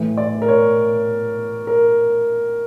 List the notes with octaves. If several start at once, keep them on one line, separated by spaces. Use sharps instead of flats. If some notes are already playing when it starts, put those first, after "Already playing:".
Already playing: A2 E3 A3
D5
A#4
C#5
A#4